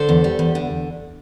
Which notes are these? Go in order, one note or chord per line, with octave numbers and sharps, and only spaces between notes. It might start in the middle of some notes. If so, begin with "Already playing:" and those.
Already playing: D3 A4 C5
E2
G3
E2
D3